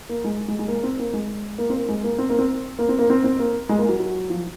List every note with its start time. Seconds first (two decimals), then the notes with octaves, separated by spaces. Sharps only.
0.09 A#3
0.24 G#3
0.48 G#3
0.59 G#3
0.68 A#3
0.83 C4
0.99 A#3
1.13 G#3
1.58 A#3
1.70 C4
1.74 A#3
1.89 G#3
2.04 A#3
2.18 C4
2.30 A#3
2.39 C4
2.79 A#3
2.89 C4
2.99 A#3
3.10 C4
3.24 C4
3.39 A#3
3.69 G#3
3.79 A#3
3.89 F#3
4.00 F#3
4.30 F3